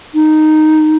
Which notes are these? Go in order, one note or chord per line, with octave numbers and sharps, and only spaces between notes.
D#4